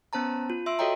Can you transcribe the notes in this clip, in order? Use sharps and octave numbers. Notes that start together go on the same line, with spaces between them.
B3 C#4 C5 A5 A#5
F4
E5 C6 E6 D7
F#4 A4 C#5 D#5 G5 A#5